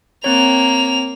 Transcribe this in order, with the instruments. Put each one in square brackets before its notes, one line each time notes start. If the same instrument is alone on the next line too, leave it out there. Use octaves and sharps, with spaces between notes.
[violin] A#3 F7 [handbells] C4 C#5